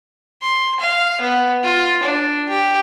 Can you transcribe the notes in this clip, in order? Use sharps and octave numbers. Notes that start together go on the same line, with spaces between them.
C6
F5
B3
F4
D4
G4